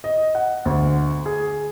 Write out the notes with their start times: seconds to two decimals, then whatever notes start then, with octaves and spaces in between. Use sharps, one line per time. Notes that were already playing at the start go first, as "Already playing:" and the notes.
0.04 D#5
0.35 F#5
0.65 D2
1.26 G#4